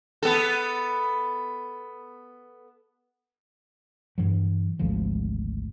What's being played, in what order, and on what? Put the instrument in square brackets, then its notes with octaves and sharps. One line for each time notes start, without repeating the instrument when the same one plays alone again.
[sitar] B3 A4
[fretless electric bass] G2 E3 F#3
G#1 D2 F3